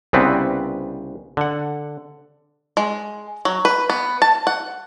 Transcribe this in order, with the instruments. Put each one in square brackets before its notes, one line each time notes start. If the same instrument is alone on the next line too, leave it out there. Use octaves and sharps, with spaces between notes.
[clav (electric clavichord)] C2 C#3 B3 C4 D4 B4
D3 F#5
[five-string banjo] G#3
F#3
B4
B3
A5
F#5